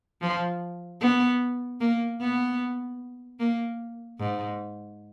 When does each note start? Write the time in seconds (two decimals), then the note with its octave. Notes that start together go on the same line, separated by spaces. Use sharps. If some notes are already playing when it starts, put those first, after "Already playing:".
0.22 F3
1.01 B3
1.81 A#3
2.21 B3
3.40 A#3
4.19 G#2